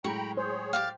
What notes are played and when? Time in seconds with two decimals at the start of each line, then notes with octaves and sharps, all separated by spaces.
0.04 A2 F#3 G#3 G5 A#5 B5 C#6
0.37 G#4 C5 C#5
0.73 G4 D5 F5 G5